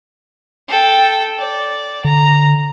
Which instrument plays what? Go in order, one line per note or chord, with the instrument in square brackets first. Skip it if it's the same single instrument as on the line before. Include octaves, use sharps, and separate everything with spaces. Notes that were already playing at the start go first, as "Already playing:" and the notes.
[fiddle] A4 G5
D5
[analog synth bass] D3 [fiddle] A#5